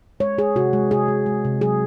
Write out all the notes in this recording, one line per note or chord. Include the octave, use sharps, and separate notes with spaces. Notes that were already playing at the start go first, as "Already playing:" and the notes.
G#3 C#5
G#3 G#4
C3 F#4
G#3
C3 G#4
G#3
G#3
C3
F#3 G#4